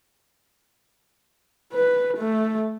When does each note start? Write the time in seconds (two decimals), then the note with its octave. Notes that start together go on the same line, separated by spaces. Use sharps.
1.73 B4
2.18 A3